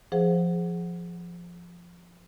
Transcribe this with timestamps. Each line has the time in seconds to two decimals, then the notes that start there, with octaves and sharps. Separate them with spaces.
0.12 F3 G#4 C5 F#5